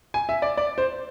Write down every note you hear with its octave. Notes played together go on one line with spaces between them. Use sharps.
G#5
E5
D5
D5
C5